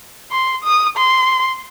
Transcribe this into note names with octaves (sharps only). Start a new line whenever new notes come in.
C6
D#6
C6